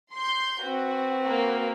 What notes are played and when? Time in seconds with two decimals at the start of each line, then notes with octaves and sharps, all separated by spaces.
0.14 C6 G6
0.63 C4 F#4 B4
1.24 A#3 F#4